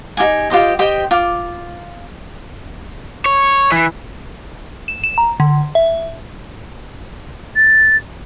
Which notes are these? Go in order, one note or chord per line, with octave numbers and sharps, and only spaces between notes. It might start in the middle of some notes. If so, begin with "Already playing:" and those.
D#4 F4 G4 G#5
F4 G4 C5 D#5
G4 C5 D#5 G5
F4 D6
C#5
E3
E7
E7
A#5
D3
E5
A6